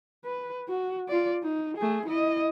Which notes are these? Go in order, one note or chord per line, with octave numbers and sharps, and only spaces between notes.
B4
F#4
F4 D5
D#4
A3 G#4
E4 D#5